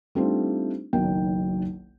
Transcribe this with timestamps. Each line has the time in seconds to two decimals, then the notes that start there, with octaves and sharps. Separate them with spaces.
0.15 G3 A3 C4 D4 D#4 F4
0.93 F#1 B1 D#3 F#3 G5